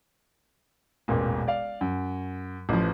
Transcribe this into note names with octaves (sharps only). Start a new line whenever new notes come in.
E1 A1 A#2
D5 F5
F#2
A1 E3 F3